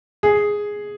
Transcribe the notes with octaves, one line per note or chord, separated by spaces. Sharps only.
G#4